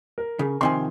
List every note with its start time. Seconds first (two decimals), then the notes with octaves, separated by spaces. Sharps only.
0.18 A#4
0.39 C#3
0.61 C3 D#3 F3 G#5 C6